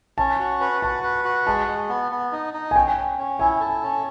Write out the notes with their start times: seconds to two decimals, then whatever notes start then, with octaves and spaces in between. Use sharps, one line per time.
0.18 C#4 A5
0.40 F#4
0.61 B4
0.82 F#4 A5
1.03 B4
1.25 F#4
1.47 G#3 A5
1.67 G#3
1.89 B3
2.12 B3
2.32 D#4
2.54 D#4
2.71 G#5
2.76 C#4 G5
2.96 C#4
3.18 C#4
3.39 E4 G#5
3.60 A4
3.83 C#4